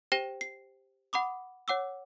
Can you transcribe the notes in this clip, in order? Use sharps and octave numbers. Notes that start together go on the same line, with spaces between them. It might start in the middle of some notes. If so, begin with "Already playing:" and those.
G4 C5 G5 A#6 E7
C7
F#5 B5 D6 D#6
C#5 F#5 D6 E6